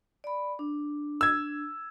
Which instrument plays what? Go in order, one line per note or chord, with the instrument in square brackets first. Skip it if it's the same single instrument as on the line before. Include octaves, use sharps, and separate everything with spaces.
[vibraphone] D5 B5
D4
[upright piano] E6 G#6